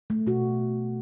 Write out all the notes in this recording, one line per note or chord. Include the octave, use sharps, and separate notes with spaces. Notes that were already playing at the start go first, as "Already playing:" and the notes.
A3
B2 F#4